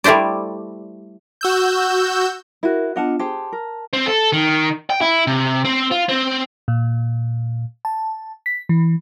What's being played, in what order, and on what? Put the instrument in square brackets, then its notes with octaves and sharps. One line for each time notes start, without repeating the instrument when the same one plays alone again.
[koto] G3 A3 E4 C5 D5
[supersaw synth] F#4 E6 G6
[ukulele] E4 F#4 [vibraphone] A#4
[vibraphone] B3 D4 F4 [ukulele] D#5 F#5 A5
[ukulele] G4 G#4 C5 [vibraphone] A5
[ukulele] A#4
[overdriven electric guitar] C4
A4
D#3
G5
E4
C3
C4
F4
C4
[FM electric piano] A#2
A5
B6
E3